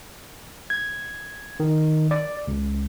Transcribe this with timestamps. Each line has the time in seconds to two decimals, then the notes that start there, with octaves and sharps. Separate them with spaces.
0.70 G#6
1.60 D#3
2.11 D5
2.48 C#2